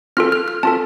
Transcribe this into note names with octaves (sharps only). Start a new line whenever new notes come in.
C4 F4 A4 F6
F6
F6
C4 F4 A4 A5